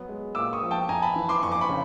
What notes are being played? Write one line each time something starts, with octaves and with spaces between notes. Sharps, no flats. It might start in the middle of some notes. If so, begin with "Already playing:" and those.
Already playing: F#3 B3
G#3
A#2 D6 E6
C#6 D#6
F3
G5 A5
F2 G#5 A#5
A5 B5
E3
C6 D6
F2 C#6
D6
B5 C#6
C#3